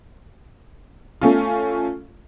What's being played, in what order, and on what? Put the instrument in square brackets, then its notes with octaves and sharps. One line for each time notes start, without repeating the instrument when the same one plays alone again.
[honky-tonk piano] A3 C#4 F4